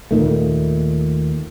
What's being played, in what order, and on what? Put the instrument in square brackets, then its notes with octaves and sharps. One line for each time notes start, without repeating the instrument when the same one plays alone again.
[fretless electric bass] D#2 A#2 D#3 A3